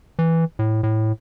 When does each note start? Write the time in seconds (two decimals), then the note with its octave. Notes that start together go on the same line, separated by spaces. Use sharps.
0.19 E3
0.59 A2
0.83 A2